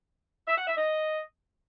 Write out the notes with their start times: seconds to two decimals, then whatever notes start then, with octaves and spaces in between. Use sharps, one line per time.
0.48 E5
0.58 F#5
0.68 E5
0.77 D#5